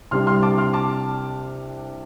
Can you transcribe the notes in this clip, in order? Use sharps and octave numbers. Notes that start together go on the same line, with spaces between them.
C2 C3 G3 D4 C6 F6
C6 F6
A5 D6
C6 F6
A5 D6